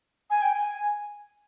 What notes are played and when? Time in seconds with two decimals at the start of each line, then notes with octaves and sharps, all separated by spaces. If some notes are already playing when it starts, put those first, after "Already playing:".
0.30 G#5
0.42 G5
0.54 G#5